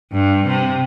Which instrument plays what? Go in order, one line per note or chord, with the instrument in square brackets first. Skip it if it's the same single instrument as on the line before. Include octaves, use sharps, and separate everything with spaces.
[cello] G2
C3